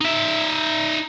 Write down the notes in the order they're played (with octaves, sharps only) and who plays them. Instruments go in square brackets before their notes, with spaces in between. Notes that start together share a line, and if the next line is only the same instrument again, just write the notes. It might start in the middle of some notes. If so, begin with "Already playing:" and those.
[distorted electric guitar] D#4 E5